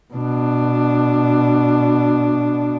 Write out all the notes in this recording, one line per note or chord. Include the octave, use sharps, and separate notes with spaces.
B2 D4